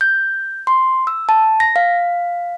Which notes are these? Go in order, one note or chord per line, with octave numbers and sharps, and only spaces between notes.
G6
C6
E6
A5
A#6
F5